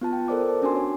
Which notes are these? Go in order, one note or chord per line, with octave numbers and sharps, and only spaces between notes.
B3 F4 A5
G5
A4 A#4 C5 D5 D6
A5
C#4 D4 F#4 G#5 C6
C#5